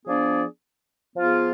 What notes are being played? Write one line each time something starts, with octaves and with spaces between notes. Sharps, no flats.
F3 B3 D4 G#4 D5
F3 B3 F4 G#4